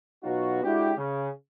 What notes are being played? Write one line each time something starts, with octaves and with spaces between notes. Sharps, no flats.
B2 F#3 B3 D#4 F4 F#4
G#3 D4 E4 F#4 G4
C#3